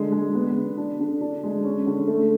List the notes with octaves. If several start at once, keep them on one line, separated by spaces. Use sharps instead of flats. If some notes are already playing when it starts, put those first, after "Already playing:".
Already playing: D3 G#3
G#3
B3
D3
D4
D3
D4
G#3
C#4
D3
A3